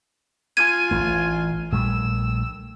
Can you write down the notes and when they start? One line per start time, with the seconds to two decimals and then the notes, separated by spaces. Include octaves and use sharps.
0.57 F4 G#5 G#6 D#7
0.91 A1 A3
1.72 A#1 G3 A3 E6